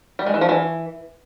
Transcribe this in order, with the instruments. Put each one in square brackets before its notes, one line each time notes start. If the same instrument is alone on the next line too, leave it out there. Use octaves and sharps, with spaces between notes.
[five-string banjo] G3
G#3
E3
F3
E3